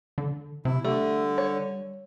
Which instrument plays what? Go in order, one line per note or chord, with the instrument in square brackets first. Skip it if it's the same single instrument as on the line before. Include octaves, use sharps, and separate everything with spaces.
[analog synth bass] D3
[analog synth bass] C3 [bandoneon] E4
[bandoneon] D3 [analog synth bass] G3 [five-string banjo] A3
[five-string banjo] C#5